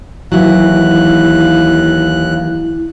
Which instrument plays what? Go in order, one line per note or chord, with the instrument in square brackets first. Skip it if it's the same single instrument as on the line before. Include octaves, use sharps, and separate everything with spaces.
[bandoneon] D#2 F#6 [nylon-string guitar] E3 F#3 [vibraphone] E4